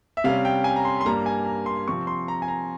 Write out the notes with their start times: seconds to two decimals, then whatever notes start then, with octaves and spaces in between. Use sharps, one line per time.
0.17 E5
0.24 C3 G3 C#4 F5
0.45 G5
0.64 G#5
0.76 A#5
0.85 C6
1.01 C6
1.05 G2 G3 A#3 A#5
1.26 G#5
1.46 A#5
1.66 C6
1.87 C3 F3 C4 C#6
2.07 C6
2.28 A#5
2.42 G#5
2.48 A#5